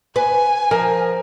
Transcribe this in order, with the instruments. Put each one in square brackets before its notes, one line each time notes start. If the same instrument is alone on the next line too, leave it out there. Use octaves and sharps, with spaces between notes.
[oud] B4 [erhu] G#5
[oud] F3 [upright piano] A#4